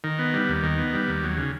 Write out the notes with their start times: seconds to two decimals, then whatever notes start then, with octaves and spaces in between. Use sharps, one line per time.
0.04 D#3
0.19 B3
0.34 G3
0.49 D#2
0.63 D#3
0.78 B3
0.93 G3
1.09 D#2
1.24 F#3
1.37 C#3